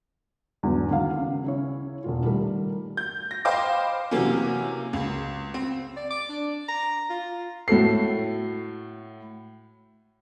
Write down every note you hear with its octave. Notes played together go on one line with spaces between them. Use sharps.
E2 G#2 D3 F#3
D2 D#3 F5
C#3
C#3 E4 C#5
E1 A#2 F4
D#3 G3 A3 A#4
G6
A#6
C5 D#5 F5 G5 B5 D6
C3 E3 F#3 A#3 C#4
C#2
C4
D5
D6
D4
A#5
F4
A2 F#4 A4 C7